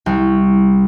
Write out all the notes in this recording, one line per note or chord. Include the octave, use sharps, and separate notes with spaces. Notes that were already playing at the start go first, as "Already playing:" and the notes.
C2